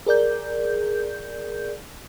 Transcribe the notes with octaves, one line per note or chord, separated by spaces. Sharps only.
G#4 A#4 D5 G6